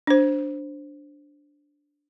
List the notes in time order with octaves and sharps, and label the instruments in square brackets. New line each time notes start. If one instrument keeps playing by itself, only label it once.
[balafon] D4 C5